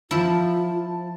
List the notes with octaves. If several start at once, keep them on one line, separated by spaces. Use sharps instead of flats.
F3 E4 F4 A5